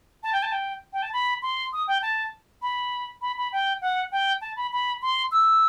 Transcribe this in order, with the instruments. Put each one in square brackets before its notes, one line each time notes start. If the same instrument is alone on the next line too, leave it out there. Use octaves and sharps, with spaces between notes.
[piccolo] A5
G5
A5
G5
G5
A5
B5
C6
D#6
G5
A5
B5
B5
B5
G5
F#5
G5
A5
B5
B5
C6
E6